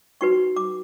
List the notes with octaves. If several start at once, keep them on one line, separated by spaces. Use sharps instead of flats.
D#4 F#4 B4 C#6
D6